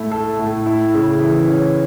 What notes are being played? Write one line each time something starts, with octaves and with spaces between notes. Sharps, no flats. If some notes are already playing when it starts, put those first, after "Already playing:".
Already playing: A2 A3 E4
A4
A2
E4
C#3
E3
C#4